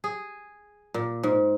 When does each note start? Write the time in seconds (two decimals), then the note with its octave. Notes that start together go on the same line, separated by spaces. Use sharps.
0.04 G#4
0.94 A#2
1.23 G#2